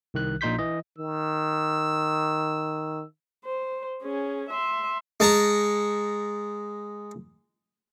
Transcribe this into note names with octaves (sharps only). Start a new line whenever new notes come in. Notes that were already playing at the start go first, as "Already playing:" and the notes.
C2 D#3 F#6
A#1 A#2 D#4 C6 G6 B6
E3 D#5
D#3 E6
C5
C#4 G#4
E5 C6
G#3 A5 A#5 C#6